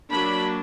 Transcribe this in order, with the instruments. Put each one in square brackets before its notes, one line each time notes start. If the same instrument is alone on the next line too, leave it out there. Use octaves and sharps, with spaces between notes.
[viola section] F#3 A#3 D4 B5